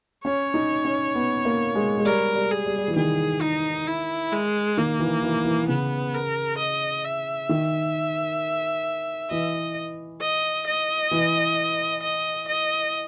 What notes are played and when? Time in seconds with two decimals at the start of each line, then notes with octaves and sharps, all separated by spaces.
0.24 C#4 C#5
0.54 D#4
0.85 C#4
1.15 B3
1.45 A#3
1.75 G#3
1.98 G#3
2.05 G3 A#4
2.36 G3
2.51 G#4
2.66 G3
2.78 G3
2.88 E3
2.96 D#3 G#4
3.41 D#4
3.87 E4
4.32 G#3
4.77 D#3 A#3
4.99 E3
5.23 E3
5.45 E3
5.68 C#3 B3
6.14 A#4
6.58 D#5
7.04 E5
7.49 D#3
9.30 E3 D#5
10.21 D#5
10.67 D#5
11.11 E3
12.02 D#5
12.48 D#5